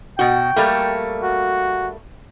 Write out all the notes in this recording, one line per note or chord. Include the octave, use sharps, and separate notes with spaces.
B2 F#4 G5
G3 A3 A#3
F#4